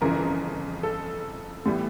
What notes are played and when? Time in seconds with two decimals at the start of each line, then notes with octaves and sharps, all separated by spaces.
0.01 G1 F2 C#3 E3 A#4
0.83 A4
1.66 A2 E3 G3 B3